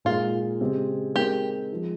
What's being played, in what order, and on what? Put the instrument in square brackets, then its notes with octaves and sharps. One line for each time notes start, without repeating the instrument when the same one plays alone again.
[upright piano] A#2 G#3 D#4 [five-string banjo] F4
[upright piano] C#3 G#3 C4 G4
[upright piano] G#3 C4 D#4 A#4 [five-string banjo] G4
[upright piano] F3 G#3 D#4